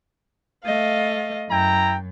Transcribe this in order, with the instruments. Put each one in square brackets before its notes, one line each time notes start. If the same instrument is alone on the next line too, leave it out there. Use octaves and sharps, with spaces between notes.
[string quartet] A3 D#5 F5
[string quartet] F#2 [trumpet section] E4 G5 A#5